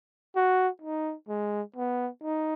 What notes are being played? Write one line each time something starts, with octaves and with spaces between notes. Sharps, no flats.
F#4
D#4
G#3
B3
D#4